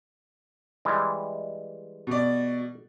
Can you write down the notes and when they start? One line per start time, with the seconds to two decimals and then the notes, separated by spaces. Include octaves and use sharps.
0.85 E3 G3 G#3
2.07 B2 D5